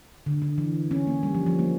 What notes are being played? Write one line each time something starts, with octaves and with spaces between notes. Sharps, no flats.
D3
D3
E3
C#4
A#3
G3
F3
F3
A#3